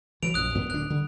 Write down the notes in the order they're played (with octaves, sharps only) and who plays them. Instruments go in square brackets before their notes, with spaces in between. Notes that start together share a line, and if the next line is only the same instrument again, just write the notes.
[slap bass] E3 F#3 [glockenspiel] D7 F7
[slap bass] A#1 F#2 [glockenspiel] D#6 F#6
[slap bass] F#2 B3
[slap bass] D1 D4 [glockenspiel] F#6
[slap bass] D3 G3